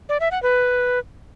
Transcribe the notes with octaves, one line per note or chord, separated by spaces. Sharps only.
D5
E5
F#5
B4